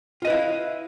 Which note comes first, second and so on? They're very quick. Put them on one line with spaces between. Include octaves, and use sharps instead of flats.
F4 D#5 B4 E4 F5